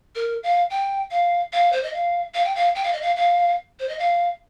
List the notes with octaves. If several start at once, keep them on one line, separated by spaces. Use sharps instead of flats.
A#4
F5
G5
F5
F5
C5
D#5
F5
F5
G5
F5
G5
F5
D#5
F5
F5
C5
D#5
F5